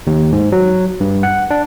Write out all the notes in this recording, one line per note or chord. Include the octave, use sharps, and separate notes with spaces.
D#2
G#2
F#3
G2
F#5
D4